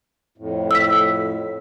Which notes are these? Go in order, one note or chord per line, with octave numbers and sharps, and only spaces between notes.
F2 A2
E6 B6